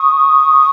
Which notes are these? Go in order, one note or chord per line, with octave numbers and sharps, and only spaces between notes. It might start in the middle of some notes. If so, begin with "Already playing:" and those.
Already playing: C#6 D#6